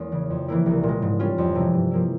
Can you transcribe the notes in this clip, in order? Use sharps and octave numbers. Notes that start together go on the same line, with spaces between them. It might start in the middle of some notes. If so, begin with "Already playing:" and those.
Already playing: E2 G#3 A#3 C#4
C#3 E3
F2
E3 A#3 E4
C2
A#2 G#3
G#2
G3 C#4 F4
F2
C3 E3
G2
F3 A#3 E4